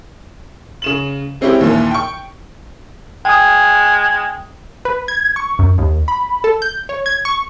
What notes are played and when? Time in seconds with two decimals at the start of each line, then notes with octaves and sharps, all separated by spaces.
0.82 C#3 E7 F#7
1.41 G#3 C4 C#4 E4 G4
1.61 D#2 A#2 E3
1.91 G5 C#6
3.25 G#3 G5 G#5 D#6
4.85 B4
5.08 G#6
5.36 C#6
5.59 F#2
5.78 D#2
6.08 B5
6.44 A4
6.62 G6
6.89 C#5
7.06 G#6
7.25 C#6